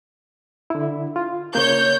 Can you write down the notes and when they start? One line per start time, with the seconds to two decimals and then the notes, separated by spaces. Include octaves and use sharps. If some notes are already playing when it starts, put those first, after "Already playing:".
0.70 D3 E4
1.16 F4
1.55 C#3 A#3 C#5 G6